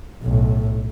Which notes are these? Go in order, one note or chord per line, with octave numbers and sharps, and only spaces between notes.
B1 A2